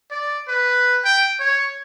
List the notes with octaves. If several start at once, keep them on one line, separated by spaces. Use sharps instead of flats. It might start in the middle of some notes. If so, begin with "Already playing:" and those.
D5
B4
G5
C#5